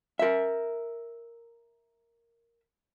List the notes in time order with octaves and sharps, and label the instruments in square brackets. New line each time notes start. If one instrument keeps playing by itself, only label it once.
[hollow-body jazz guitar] A#4 E5